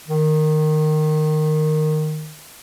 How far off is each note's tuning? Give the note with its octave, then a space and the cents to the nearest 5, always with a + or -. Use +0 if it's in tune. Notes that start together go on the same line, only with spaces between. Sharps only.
D#3 -15